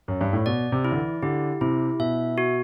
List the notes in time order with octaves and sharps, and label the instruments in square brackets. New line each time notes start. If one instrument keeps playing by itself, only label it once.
[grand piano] F#2
G2
A2
[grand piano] B2 [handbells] D5
[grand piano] C3
[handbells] E4
[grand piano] D3
E3
[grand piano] D3 [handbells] G4
[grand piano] C3 [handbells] E4
[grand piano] B2 [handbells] E5
[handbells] F#4